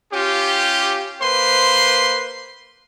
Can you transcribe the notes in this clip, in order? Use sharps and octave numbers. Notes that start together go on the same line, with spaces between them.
C#4 F4 G4
A#3 B4 C5 C6